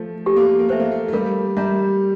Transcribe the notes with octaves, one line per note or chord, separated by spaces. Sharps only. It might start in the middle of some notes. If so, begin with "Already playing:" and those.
Already playing: F3 A3
A3 G4
A#3
A3
A#3
A3 C5 E5
A#3
A3
A3
G3 A#4
G3 E5 A#5